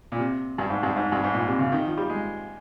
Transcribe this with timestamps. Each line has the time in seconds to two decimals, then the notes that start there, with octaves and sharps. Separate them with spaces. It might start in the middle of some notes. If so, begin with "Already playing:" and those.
0.12 A#2
0.19 C3
0.58 G2
0.70 G#2
0.83 G2
0.96 G#2
1.12 G2
1.24 G#2
1.34 A#2
1.47 C3
1.59 C#3
1.72 D#3
1.85 F3
1.97 G3
2.09 G#3